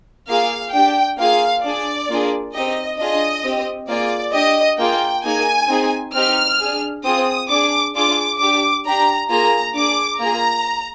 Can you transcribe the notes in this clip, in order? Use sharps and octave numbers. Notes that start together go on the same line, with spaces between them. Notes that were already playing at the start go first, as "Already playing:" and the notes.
A#3 F4 G#4 F5
D4 G4 G5
A#3 F4 G#4 F5
D4 G#4 D5
A#3 D4 F4 G#4
C4 D#4 G4 D#5
D4 F4 G#4 D#5
C4 G4
A#3 F4 G#4 D5
D4 G4 D#5
A#3 F4 G#4 G5
A#3 D#4 G#4 G#5
C4 D#4 G#4
C4 D#4 G4 F6
D4 G#4
C4 F4 G#4 D#6
D4 G#4 D6
D4 F4 G#4 D6
D4 G4 D6
D4 G4 A#5
A#3 F4 G#4 A#5
D4 G#4 D6
A#3 F4 G#4 A#5